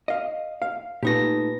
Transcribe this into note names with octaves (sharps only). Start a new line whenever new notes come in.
D#5 F5
F5
A#2 A3 D#4 G4 B4 A#6